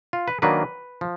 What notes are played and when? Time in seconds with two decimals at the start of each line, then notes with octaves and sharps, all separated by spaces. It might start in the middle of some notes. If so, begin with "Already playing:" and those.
0.13 F4
0.28 B4
0.42 D#3 F#3 A#3 D4 B4
1.01 F3